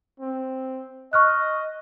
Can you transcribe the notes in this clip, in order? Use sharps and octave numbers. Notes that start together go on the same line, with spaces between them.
C4
D#5 C#6 F6 F#6